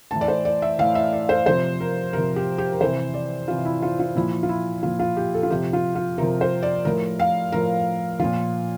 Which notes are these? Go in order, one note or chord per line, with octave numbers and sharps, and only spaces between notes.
A2 E3 A5
D5
C5
D5
E5
A2 E3 F5
E5
D5
C5
C3 F3 C5
A#4
C3 F3 A#4
G4
G4
A#4
C3 E3 C5
D5
C3 E3 F4
E4
F4
F4
A#2 F3 E4
F4
E4
A#2 F3 F4
F4
G4
A4
F4
C3 F3 G4
F4
F4
C3 F3 A#4
C5
D5
A2 F3 A#4
F5
A2 F3 A#4
A#2 F3 F4